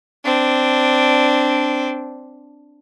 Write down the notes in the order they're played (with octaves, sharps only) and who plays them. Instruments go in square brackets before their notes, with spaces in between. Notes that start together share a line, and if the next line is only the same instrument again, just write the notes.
[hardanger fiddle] C4 D4